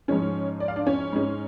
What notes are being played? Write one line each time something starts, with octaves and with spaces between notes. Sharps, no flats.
G#2 F3 G#3 C#4 C#5
D5
F5
D4 D5
C#4 C#5
G#2 G#3 C#4